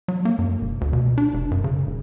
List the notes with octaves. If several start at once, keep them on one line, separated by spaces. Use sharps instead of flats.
F#3
A#3
F#2
E1
D2
B2
D4
F1
F#2
C#3
D#1